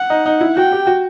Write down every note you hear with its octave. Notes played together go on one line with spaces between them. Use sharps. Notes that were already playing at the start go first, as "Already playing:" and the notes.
Already playing: F#5
D#4
D#4
E4
F#4 G5
G4
F#4